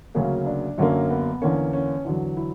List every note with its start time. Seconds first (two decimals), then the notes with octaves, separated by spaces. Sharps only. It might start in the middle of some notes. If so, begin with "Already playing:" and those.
0.15 D2 C#3 F#3 A#3 C#4
0.46 D4
0.78 F#2 D3 F#3 A#3 C#4
1.10 B3
1.42 E2 D3 A#3 C#4
1.73 C#4
2.05 E2 D3 F#3
2.37 E4